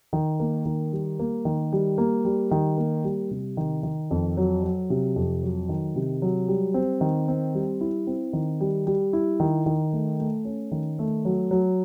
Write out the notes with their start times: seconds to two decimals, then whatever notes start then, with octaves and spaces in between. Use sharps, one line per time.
0.13 D#3
0.40 A#3
0.65 D#3
0.92 G3
1.19 A#3
1.45 D#3
1.73 G3
1.98 A#3
2.25 G3
2.51 D#3
2.78 A#3
3.04 G3
3.31 C3
3.57 D#3
3.83 D#3
4.11 F2
4.37 F#3
4.64 F#3
4.90 C3
5.16 F2
5.43 F#3
5.69 D#3
5.96 C3
6.22 F#3
6.48 G3
6.74 C4
7.01 D#3
7.28 C4
7.54 G3
7.81 E4
8.07 C4
8.33 D#3
8.60 G3
8.87 G3
9.13 E4
9.40 D#3
9.66 D#3
9.93 A3
10.19 A3
10.45 C#4
10.71 D#3
10.99 A3
11.25 F#3
11.51 F#3